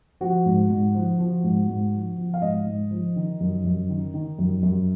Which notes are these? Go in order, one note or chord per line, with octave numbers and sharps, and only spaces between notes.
F3 F#4
G#2
G#2
F3
F3
G#2
G#2
F3
F3
F5
G#2 D#5
G#2
F3
D#3
F#2
F#2
D#3
D#3
F#2
F#2